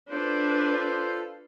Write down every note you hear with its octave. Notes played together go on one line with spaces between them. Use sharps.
D4 F4 A4 B4 C5